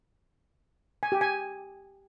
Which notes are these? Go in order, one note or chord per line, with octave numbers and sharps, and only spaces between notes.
G#5
G4
G#5